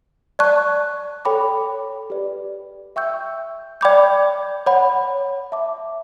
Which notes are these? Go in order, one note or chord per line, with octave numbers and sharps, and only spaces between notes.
D5 A5 C#6 F#6
A4 C#5 G5 B5 D6
G4 B4 D5
E5 G5 C#6 E6 G6
D5 G5 B5 D6 G6
C#5 F#5 B5
E5 A5 D6